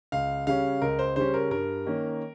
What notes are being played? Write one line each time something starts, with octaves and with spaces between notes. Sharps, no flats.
C#2 F5
C#3 G3 C#4 F5
C#2 A#4
C5
C#3 G3 C#4 C5
A#4
G2 A#4
D#3 A#3 C#4